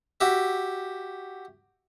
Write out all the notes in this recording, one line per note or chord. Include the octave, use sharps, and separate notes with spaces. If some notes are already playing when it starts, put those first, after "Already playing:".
F#4 G4 E5